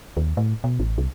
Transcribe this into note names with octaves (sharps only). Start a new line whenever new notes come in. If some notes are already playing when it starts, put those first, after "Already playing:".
D#2
A2
B2
A1
C2